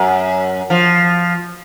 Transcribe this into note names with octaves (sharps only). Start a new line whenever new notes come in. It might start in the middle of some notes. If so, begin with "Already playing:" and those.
Already playing: F#2
F3